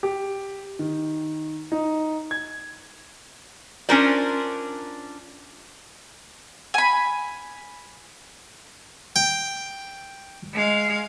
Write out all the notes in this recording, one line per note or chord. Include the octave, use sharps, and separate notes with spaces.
G4
D#3
D#4
G#6
C#4 D4 F4 A#4 C5 D5
G#5 B5
G5
G#3 F5